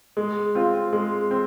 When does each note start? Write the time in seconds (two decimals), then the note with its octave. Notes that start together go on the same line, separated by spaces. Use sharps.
0.17 G#3
0.55 C4 F4
0.93 G#3
1.31 C4